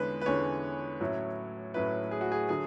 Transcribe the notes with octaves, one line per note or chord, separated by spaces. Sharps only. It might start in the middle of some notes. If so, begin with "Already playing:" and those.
Already playing: E2 D3 G#3 C#4 B4
B4
E2 D3 G#3 C#4 C#5
A2 F#3 C#4 E4
A2 F#3 C#4 E4 B4
G#4
F#4
G#4
D3 F#3 G#4